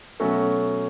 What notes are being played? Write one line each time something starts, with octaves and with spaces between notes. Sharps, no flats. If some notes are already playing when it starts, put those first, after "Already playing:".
B2 F#3 A3 C#4 F#4